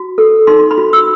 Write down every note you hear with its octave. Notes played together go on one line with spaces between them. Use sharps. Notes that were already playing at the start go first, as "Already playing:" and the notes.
Already playing: F#4
A4
D#4 C6
B5
F#4
E6